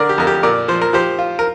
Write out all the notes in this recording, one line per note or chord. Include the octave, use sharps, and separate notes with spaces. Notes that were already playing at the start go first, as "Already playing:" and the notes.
Already playing: D3 A#4 D5
G4
F2 A#4
G4
A#2 A#4 D5
F3 C5
A#4
F3 G4 C5
F4
A#4